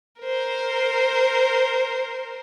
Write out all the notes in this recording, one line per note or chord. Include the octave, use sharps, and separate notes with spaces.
A#4 C5